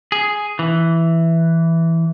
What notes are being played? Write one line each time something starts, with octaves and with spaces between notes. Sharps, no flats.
G#4
E3